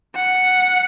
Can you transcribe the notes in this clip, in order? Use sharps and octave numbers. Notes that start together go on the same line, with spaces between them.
F#5